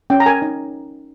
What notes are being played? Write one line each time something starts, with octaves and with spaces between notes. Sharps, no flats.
C#4 G5
A#5
A#4 G#5
D#4